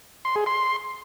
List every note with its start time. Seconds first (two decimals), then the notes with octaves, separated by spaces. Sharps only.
0.25 C6
0.36 G#4
0.46 C6